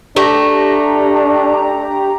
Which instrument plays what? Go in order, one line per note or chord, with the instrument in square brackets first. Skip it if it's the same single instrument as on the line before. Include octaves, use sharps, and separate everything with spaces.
[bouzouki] A3 [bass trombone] D4 [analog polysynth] G4 A#5